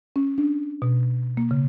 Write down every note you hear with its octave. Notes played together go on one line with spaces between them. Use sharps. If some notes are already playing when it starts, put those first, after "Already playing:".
C#4
D4
B2
A#3
C#3